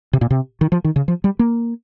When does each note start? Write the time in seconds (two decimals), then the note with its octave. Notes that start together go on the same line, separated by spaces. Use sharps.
0.13 C3
0.21 A#2
0.31 C3
0.61 D#3
0.72 F3
0.84 D#3
0.96 C#3
1.08 F3
1.24 G3
1.39 A#3